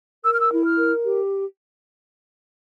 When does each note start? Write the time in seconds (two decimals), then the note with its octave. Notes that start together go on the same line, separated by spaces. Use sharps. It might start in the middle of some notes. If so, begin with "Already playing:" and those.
0.24 A#4 E6
0.32 F6
0.39 E6
0.51 E4
0.64 F6
0.77 A#4
1.03 G4